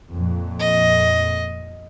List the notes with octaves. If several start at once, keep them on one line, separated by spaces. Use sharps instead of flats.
F2 A#2
D#5